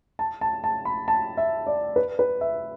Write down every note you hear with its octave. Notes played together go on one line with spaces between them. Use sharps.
A5
A5
A5
B5
A5
E5
D5
B4
B4
E5